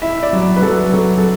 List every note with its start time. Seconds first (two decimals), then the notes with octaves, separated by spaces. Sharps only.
0.02 E4 E5
0.23 D5
0.33 F#3
0.56 B4
0.62 F#3 A4
0.93 F#3 A4
1.18 A4